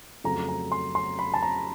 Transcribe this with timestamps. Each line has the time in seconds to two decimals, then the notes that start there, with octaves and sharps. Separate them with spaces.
0.24 F2 C#3 F#3 A3 A#5
0.49 A#5
0.72 C6
0.95 C6
1.19 B5
1.34 A5
1.42 A#5